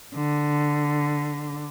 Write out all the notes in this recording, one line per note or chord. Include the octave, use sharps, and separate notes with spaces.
D3